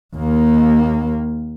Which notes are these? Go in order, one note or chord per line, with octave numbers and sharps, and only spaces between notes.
D#2 A#3